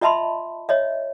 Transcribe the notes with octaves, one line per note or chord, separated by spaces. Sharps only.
F4 D#5 E5 A5 B5 C6
C#5 D#5 E5